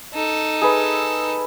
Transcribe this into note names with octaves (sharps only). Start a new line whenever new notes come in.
D#4 A4
G#4 B4 E6